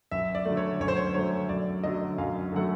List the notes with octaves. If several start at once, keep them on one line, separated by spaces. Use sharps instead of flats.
F#2 E5
D5
D3 F#3 A3
C#5
F#2 C#5
C5
C#5
C5
D3 F#3 A3 C#5
F#2 D5
D3 F#3 A3 D#5
F#2 F5
D3 F#3 A3 F#5